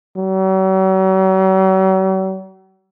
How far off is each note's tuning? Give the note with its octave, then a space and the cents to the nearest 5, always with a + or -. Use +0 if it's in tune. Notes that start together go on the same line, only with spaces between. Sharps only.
F#3 +45